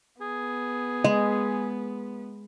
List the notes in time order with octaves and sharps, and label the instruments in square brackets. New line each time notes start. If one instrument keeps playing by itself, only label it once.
[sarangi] B3 [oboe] G#4
[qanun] G#3 [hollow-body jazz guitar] D#5